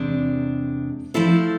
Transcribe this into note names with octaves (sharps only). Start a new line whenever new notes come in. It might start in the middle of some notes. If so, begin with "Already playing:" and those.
Already playing: E2 C3 G#3 D4
F3 A3 E4 A4 C5